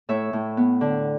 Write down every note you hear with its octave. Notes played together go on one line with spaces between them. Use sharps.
A2 C#5 E5
A2
B3
D3